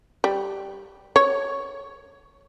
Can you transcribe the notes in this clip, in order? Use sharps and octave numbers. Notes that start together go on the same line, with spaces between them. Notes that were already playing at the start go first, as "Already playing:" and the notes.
G3
C#5